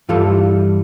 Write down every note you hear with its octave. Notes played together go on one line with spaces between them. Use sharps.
G2 E3 G3 F4 A4